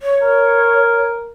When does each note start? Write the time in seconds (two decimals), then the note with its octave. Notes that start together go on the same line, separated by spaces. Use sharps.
0.03 C#5
0.22 A#4